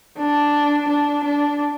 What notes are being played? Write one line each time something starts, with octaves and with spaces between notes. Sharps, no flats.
D4
D4
D4